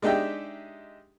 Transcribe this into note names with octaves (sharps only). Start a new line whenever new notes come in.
G#3 D4 D#4 G4 E5 G5